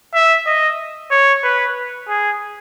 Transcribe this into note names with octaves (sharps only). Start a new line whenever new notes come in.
E5
D#5
C#5
B4
G#4